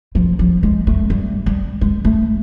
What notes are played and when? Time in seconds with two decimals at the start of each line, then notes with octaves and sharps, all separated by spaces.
0.15 F3
0.39 F3
0.63 G#3
0.87 A3
1.10 G3
1.46 G3
1.81 G#3
2.05 A3